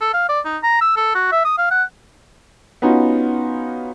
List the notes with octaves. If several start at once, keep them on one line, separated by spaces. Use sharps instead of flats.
A4
F5
D5
D#4
A#5
E6
A4
F#4
E5
D#6
F5
F#5
B3 C#4 D#4 F4 F#4